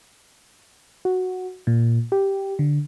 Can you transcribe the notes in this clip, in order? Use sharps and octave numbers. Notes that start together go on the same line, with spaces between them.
F#4
A#2
G4
D3